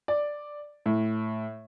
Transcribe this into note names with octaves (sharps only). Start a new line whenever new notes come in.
D5
A2